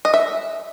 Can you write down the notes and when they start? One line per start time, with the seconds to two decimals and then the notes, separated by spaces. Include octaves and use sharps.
0.05 D#5
0.14 E5